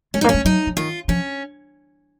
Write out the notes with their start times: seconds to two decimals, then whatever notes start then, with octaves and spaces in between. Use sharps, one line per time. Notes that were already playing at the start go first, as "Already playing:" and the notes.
0.14 G#3 C#4
0.21 D#4
0.24 A#3
0.29 C#4
0.34 G#3
0.45 F#3 D#4
0.67 F3
0.77 D#3 F4
1.08 F3 C#4